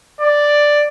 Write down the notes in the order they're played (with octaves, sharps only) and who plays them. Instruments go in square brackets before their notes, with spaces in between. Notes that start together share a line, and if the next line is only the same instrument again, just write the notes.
[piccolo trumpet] D5